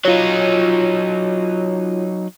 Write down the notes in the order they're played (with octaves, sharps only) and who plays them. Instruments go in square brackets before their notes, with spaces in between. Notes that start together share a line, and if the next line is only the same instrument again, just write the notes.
[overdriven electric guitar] F#3 D#4 [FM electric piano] F4 C#5